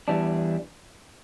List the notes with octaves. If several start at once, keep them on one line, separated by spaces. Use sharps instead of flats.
E2 E3 G3 D4